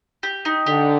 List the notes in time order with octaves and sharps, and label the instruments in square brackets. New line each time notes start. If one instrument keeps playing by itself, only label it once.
[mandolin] G4
D#4
[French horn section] D3 [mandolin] G4